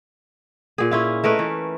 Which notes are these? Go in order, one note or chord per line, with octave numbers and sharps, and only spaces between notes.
A#2 G#4
C#4 E4 F4
A3 A#4 B4 D#5
E3